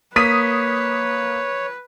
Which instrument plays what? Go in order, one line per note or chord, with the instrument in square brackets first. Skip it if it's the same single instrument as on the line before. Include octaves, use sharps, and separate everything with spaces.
[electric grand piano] A#3 [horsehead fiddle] B4 [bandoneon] C#5 [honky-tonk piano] D#6 B6 D#7